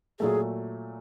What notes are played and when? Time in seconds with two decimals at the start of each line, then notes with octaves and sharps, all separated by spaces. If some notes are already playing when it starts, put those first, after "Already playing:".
0.20 A#2 F#3 A3 G#4